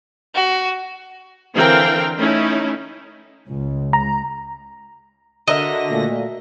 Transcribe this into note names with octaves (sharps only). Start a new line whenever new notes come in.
F#4
D3 E3 C4 A#4 F5 G5
A3 C#4 D#4 E4
C#2
A#5
D3 F#4 A#4 D#5 E5 A#6
A#2 A3